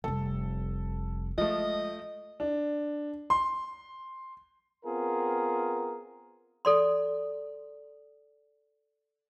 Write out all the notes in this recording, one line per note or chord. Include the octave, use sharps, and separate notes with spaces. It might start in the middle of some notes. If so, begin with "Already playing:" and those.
F1 G3 A4
F3 G#3 A3 D#5
D4
C6
B3 C4 F4 G#4 A#4
A4 D5 C6